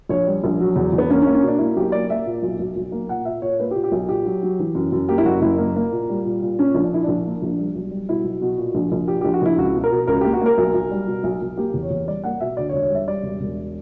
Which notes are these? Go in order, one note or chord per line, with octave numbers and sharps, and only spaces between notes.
A#1 C#5
G3
A#1
F#3
E2
E2
B3
A#3 C#4
C#4
A#3
C#4
B2 D4
A#3 E4
B1 G4
A#3 D5
A#3 E5
A#2
B1
B1
B1
A#3
A#2 F#5
A#2 E5
A#2 C#5
A#3 B4
G4
A#2
G4
B1
A#2 G4
F#3
F#3
E3
F#2
F#2
A#3 G4
E4
F#1 F#4
F#1 E4
A#3
A#3
A#2
G3
A#2
A#2
A#2 C#4
A#1
D4
A#2 E4
A#1 D4
A#3
A#1
G3
B1
G3
B2 E4
B1
B2 F#4
A#2
A#1
A#1
A#2 G4
A#1 G4
F#4
A#1 E4
C#2 F#4
B2
A#4
B2
C#2 A#4
A#3 G4
F#4
A#3 A#4
B1
B1
G3
B2
B1
B1
A#3 G4
E2
C#5
E2
G3 D5
A#3 F#5
B2 E5
D2 D5
C#5
E1
C#5
G3 E5
G3 D5
E1
E1